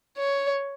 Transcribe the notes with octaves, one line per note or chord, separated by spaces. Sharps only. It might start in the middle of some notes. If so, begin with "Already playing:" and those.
C#5